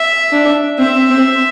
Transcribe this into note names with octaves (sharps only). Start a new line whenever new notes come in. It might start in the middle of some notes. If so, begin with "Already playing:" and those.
Already playing: E5
D4
C4 E5
C4